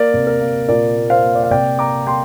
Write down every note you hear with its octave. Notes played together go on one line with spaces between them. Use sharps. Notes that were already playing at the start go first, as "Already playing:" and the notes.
Already playing: A#3 A#4 D5
C3
A#4
A#3
A#2 A#4 D5
A#3
C5 F5
A#3
D5
F5
C3 D5 G5
A#3 A#5 D6
A#3 G5 C6